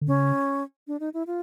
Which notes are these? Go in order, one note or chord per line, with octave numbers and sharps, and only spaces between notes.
D3
C#3 C#4
D4
D#4
E4
F4